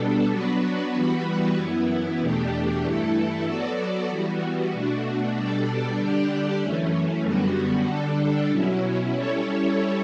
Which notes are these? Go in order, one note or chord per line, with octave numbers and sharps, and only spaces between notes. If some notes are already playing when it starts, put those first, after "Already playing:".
Already playing: B2 G3 B3 D4 A4
F#3 B3 D4 F#4 B4
E3 G3 B3 F#4 B4
F#2 E3 B3 E4
E2 B2 A3 D4 G4
G2 E3 A3 E4 A4
F#3 B3 F#4 A4 D5
E3 G3 B3 F#4
B2 A3 D4 F#4
B2 G3 D4 A4 D5
D3 G3 D4 G4 D5
F#2 E3 A3 C#4
F#2 D3 G3 B3 F#4
D3 G3 D4 A4
B2 F#3 C#4 E4
G3 C#4 E4 A4 C#5